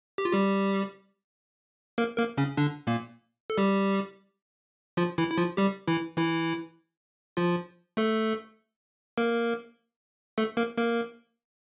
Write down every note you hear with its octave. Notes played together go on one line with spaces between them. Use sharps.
G4
F4
G3 G4
A#3 A#4
A#3 A#4
C#3 C#4
D3 D4
A#2 A#3
A4
G3 G4
F3 F4
E3 E4
E4
F3 F4
G3 G4
E3 E4
E3 E4
F3 F4
A3 A4
A#3 A#4
A3 A4
A#3 A#4
A#3 A#4